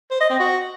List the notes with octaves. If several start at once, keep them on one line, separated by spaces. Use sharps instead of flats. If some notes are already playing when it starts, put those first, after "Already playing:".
C5
D#5
C4
F#4